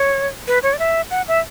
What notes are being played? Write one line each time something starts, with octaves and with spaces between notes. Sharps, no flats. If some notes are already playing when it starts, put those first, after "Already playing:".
Already playing: C#5
B4
C#5
D5
E5
F#5
E5